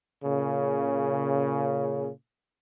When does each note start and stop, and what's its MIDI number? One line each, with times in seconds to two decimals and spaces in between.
0.23 2.09 46
0.23 2.09 49